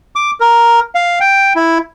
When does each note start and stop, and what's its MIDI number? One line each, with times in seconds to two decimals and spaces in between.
0.16 0.31 86
0.40 0.80 70
0.95 1.19 77
1.20 1.53 79
1.56 1.78 64